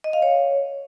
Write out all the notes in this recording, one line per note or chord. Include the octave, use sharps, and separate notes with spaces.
D#5
F5
C#5